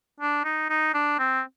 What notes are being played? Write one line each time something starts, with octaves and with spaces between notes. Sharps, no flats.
D4
D#4
D#4
D4
C4